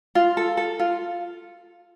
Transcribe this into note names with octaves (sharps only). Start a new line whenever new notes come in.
F4
A4
A4
F4